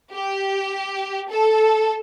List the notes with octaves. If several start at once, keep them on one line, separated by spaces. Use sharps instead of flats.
G4
A4